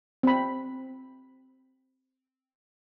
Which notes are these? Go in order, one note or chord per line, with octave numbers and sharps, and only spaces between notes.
C4 B5